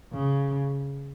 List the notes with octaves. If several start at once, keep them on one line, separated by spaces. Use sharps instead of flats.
C#3